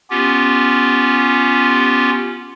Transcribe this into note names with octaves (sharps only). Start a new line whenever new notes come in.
B3 C#4 F4 G4